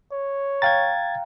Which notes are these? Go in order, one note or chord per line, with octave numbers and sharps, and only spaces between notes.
C#5
F5 G5 A#5 G#6 A6